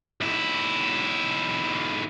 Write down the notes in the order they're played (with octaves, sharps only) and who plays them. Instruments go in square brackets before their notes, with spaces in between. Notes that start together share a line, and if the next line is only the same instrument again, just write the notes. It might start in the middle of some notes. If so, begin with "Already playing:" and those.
[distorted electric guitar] B1 E4